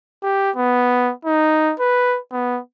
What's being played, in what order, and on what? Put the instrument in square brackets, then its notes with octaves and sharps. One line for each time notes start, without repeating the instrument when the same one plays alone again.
[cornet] G4
B3
D#4
B4
B3